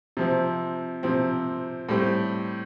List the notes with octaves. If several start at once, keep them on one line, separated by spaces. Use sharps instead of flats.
C3 F3 C4
C3 F3 C4
A2 G3 C4